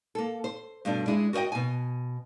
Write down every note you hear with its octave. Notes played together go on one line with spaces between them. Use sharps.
A#3 A4
C5
G2 B2 A3 D4
G#3 D4 E4 G#4
F#4 A#4 C5 D#5 G5
B2 G#5